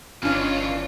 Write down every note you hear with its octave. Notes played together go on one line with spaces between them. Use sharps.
G1 D#3 E3 C#4 D4 F4 C#5 D#5